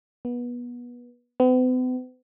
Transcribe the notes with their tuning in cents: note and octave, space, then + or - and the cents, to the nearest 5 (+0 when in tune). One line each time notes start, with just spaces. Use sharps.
B3 -25
B3 +45